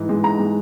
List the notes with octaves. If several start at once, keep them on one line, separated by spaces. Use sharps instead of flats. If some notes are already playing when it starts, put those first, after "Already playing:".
Already playing: G#2 E3
G#3
G#2 A#5
G#3